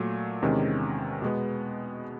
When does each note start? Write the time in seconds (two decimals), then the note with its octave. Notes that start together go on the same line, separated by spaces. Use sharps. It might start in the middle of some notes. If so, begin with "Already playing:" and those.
Already playing: A#2 F#3 A3
0.42 E2 C3 D#3 G#3 C#4
1.22 B2 G#3 B3